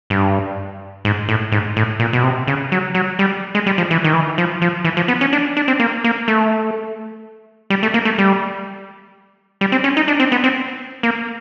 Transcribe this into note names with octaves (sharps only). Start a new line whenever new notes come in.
G2
G#2
A2
G#2
A2
A#2
B2
C3
C#3
F#3
F#3
G3
G#3
G3
F3
E3
D#3
E3
F3
F3
E3
F3
B3
C#4
D4
D4
C4
A#3
A#3
A3
G3
A3
A#3
A3
G3
G3
C4
C#4
D#4
D4
C4
B3
C4
A#3